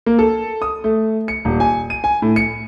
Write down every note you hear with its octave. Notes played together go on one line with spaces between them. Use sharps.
A#3
A4
D#6
A3
C#7
D#1
G#5
D#7
G#5
A2
C#7